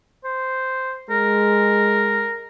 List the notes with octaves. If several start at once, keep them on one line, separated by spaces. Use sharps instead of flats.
C5
G#3 A#4